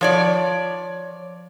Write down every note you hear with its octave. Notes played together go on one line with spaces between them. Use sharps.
F3 C#5 D5